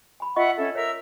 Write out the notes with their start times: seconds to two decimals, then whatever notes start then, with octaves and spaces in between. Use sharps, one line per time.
0.20 G#5 B5
0.36 F4 D#5 E5 F#5 C#6
0.57 C#4 A4 E5
0.75 A#4 C#5 E5 E6